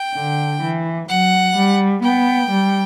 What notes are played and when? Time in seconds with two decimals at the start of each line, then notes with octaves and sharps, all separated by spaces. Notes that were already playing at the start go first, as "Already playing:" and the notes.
Already playing: G5
0.15 D3
0.62 E3
1.09 F#3 F#5
1.56 G3
2.03 B3 G5
2.51 G3